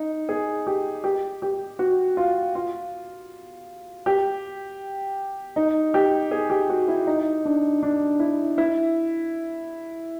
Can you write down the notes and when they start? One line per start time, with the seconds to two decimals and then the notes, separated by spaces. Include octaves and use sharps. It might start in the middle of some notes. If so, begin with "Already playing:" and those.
Already playing: D#4
0.29 G#4
0.67 G4
1.04 G4
1.42 G4
1.79 F#4
2.17 F4
2.55 F4
4.06 G4
5.56 D#4
5.94 G4
6.31 G#4
6.50 G4
6.70 F#4
6.88 E4
7.07 D#4
7.45 D4
7.83 D4
8.20 E4
8.58 E4